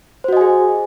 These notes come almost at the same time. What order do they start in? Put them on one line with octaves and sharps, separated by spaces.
C5 F#4 D#5 G#5 G#4